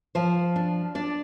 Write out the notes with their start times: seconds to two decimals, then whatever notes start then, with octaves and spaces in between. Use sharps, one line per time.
0.15 F3 C5
0.56 D4
0.95 D4 D5